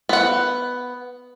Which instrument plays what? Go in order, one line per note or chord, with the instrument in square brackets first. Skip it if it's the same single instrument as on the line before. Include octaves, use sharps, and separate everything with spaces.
[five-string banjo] B3 F#5